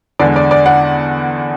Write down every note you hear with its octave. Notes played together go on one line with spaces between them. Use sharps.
E2 D3 G#3 D5
D5
D5
D5 F#5